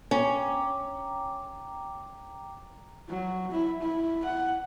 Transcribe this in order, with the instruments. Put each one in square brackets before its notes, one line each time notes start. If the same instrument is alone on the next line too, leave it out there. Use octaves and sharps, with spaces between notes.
[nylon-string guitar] C#4 [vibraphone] G5 A#5 D6
[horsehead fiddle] F#3
E4
E4
F#5